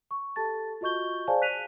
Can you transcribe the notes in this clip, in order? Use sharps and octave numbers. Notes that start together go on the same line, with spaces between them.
C#6
G4 A4 A5 A6
F4 F#4 D#5 C#6 G6 G7
G#4 C5 D5 F5 G#5 A5
F#6 B6 D#7 F7